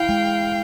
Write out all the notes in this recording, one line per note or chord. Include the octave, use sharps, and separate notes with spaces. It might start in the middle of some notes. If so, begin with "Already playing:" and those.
Already playing: E4 F5 G5
G#3